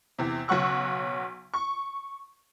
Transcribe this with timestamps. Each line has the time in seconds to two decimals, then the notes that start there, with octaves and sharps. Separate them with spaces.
0.19 E2 C3
0.48 B1 C#3 F#3 F#5 C#6 E6
1.54 C#6